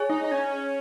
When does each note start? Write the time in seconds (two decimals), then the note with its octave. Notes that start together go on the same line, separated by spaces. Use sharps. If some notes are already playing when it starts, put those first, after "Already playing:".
Already playing: G#4 C#5 G#5
0.09 D#4
0.24 D#4
0.32 C#4